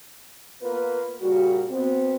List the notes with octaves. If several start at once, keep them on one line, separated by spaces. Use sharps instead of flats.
A#3 B3 F4 A#4 B4
A#2 C#3 G3 A#3 F#4
B2 B3 C4